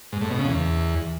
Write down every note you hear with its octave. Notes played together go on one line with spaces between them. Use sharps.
G#2
A2
B2
C#3
E2